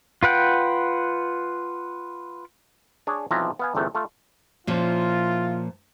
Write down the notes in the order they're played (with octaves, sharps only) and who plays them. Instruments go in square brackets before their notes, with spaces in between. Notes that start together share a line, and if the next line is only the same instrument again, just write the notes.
[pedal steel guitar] F4 B4 F#5 G5
[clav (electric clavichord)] D4 G#4 C#5
B1 E3 F3 C4 E5 A#5
B3 F5 G#5
G1 E2 C3 A3
A3 F4
[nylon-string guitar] A#2 F3 C#4 [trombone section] E4 F4